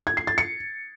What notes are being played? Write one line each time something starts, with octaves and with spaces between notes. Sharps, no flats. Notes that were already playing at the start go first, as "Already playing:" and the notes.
G#6
C7
A6
C#7